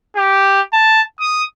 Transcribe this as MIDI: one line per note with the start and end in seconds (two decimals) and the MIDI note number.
0.16 0.61 67
0.73 1.02 81
1.20 1.43 87